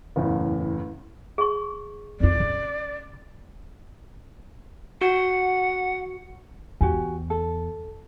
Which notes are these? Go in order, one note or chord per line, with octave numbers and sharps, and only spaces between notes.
F#1 E2 A2
G#4 C#6
F2 F4 D5
C#3
F#4 F#5
E2 F#4 G4 G#5
A4